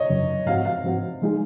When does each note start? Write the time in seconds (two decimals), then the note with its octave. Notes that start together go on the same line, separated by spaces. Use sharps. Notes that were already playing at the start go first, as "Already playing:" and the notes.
Already playing: C#5 D#5
0.10 F#2 C#3 F#3
0.46 G#2 F3 C4 F#4 F5
0.65 F5
0.84 G#2 F3 C4 F#4
1.22 F3 G#3 D#4 G#4